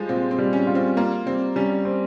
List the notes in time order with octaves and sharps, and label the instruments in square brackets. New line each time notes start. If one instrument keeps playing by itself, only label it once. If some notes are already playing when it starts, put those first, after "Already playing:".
Already playing: [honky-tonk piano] F3 G3 G#3
[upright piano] A#2 [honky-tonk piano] C4
[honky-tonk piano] C4
[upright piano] G3
[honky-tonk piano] C#4
[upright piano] F4
[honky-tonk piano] C4
[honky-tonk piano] A#3 [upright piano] F4
[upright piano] G3 [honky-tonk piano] C4
[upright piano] G3 [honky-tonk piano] C#4
[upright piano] C4